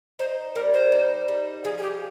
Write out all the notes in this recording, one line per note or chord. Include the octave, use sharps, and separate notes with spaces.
D#4 C5
G3 A#4
C5
D#4
G3
F3 G#4
G#4
G4